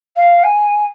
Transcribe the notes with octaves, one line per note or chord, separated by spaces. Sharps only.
F5
G#5